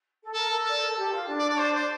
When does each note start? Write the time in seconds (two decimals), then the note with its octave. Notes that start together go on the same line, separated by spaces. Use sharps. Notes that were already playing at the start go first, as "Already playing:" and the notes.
0.22 A4
0.34 A4 A#4
0.65 A4 D5
0.75 C5
0.82 A#4
0.89 A4
0.97 G4
1.12 F4
1.28 D4
1.39 D5
1.49 D5
1.59 C5
1.75 C5